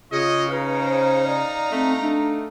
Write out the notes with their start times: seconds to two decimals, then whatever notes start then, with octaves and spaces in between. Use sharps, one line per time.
0.12 C#3 F4 C#5 D#5
0.50 D#4 B4 F5 A#5
0.85 C5
1.28 D5
1.72 A3 C4
2.01 A3 D4